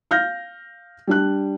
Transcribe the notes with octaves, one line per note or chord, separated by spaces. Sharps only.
F5 F6 G6 A#6
G3 D4 F#6